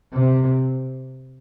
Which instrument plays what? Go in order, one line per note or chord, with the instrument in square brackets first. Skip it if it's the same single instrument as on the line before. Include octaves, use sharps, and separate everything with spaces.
[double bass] C3